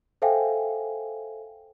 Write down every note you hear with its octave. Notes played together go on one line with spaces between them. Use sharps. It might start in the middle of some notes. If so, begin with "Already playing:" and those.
A4 C5 E5 F5 G5 G#5